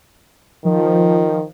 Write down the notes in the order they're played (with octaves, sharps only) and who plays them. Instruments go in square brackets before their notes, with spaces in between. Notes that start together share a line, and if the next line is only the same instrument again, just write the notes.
[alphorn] D#3 [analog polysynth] F3